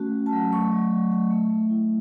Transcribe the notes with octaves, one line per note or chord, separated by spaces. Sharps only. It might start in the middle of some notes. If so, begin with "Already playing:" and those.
Already playing: A3 C#4 F#4
F#4
A5
F#3
A3 C#6
F#3
F#3
A3
A3
A3
E4